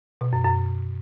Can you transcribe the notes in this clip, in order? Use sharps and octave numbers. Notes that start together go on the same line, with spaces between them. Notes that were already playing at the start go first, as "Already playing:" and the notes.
B2
F#2
F#2